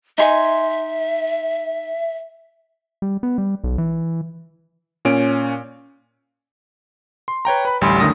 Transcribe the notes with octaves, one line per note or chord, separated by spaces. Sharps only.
D#4 E5 G#5 C6
G3
B3
G3
B1
E3
A#2 C#4 D7
C6
B4 C#5 G5 A#5
B4 B5
A1 D2 G3 G#5 B5 C6
F#2 D3 D#3 A3 D#6 A#6